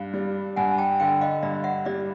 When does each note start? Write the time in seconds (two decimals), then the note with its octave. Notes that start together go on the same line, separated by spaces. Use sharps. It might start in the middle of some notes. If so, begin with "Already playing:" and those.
Already playing: G2 F5
0.13 G3
0.56 G2 F#5 G#5
0.78 G5 A5
1.00 D3 F5 G5
1.21 D#5 F5
1.43 G2 D5 E5
1.64 E5 F#5
1.85 G3 D5 E5